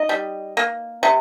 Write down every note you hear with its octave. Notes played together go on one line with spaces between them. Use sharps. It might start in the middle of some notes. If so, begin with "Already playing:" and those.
Already playing: D#4 D#5
G3
A#3
C3